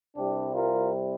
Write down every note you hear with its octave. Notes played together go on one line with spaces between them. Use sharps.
C2 C3 G3 D4 G4
F4 A#4